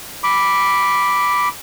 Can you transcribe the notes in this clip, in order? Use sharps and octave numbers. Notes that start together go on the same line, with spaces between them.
B5 D6